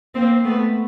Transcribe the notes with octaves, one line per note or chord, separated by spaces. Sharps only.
A#3 C4
A3 B3